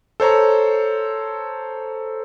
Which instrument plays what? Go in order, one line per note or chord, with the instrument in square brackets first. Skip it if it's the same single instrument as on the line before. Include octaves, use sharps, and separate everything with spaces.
[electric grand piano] A4 C5 C#5 A#5